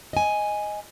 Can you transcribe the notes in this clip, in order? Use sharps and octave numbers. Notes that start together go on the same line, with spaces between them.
D#5 G#5